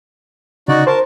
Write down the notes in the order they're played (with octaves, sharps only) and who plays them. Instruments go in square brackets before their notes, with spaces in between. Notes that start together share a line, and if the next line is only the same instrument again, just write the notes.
[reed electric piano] C#3 [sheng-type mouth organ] D#4 F#4 D5
[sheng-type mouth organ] A#4 A5 [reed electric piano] C5